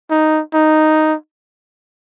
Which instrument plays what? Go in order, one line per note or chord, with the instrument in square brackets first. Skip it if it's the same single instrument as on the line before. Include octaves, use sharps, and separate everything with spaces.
[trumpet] D#4
D#4